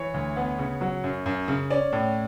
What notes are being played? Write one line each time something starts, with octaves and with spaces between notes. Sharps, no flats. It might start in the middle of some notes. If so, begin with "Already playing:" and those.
Already playing: E3 C#5
D2
B3
C#3
F#3
F#2
F#2
C#3
C#4 D5
A2